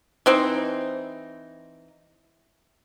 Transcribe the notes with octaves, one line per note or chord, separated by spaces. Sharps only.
E3 C4 D#4